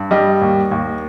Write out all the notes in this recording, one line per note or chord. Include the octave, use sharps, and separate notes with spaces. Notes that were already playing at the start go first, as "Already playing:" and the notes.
Already playing: G2
G3 D#5
D#2
D#2